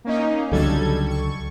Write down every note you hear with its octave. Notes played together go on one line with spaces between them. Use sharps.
A#3 C#4 D#4
C#2 D3 F#3 G3 A4 G#6
C#6